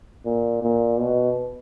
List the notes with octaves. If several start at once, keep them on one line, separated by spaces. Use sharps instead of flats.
A#2
A#2
B2